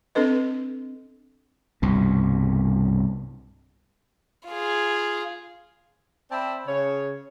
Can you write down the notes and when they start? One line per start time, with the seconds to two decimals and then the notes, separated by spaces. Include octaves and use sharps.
0.15 C4 D4 A4 B4 D#5
1.82 C2 G2 B2
4.48 F4 G#4
6.31 C4 D5 E5 A5 B5
6.68 C#3 C#5